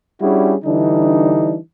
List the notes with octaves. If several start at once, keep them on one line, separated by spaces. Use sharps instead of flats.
G3 C#4 D4 E4 F#4 G#4
D3 E3 G3 D4 D#4